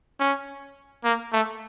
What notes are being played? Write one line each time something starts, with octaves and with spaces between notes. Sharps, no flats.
C#4
A#3
A3